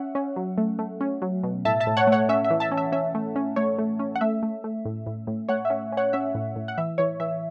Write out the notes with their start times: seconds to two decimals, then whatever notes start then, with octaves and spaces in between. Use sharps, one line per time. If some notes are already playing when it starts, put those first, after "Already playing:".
Already playing: C#4 E5 F#5
0.15 C#4
0.36 F#3
0.58 A3
0.79 A3
1.01 C#4
1.22 F#3
1.43 B2
1.65 A2 E5 A5
1.80 E5 A5
1.87 A2
1.97 C#5 F#5
2.07 A3
2.12 C#5 F#5
2.29 C#4 E5
2.45 E5
2.51 E3
2.60 E5 A5
2.72 C#4
2.77 E5
2.92 C#4 E5
3.15 A3
3.36 C#4
3.56 A3 C#5
3.79 A3
3.99 C#4
4.16 F#5
4.21 A3 E5
4.43 A3
4.64 A3
4.85 A2
5.06 A2
5.27 A2
5.49 A3 C#5 F#5
5.65 E5
5.70 C#4
5.92 C#4 C#5 F#5
6.13 C#4 E5
6.35 A2
6.56 A2
6.68 F#5
6.78 E3 E5
6.98 E3 C#5
7.20 E3 E5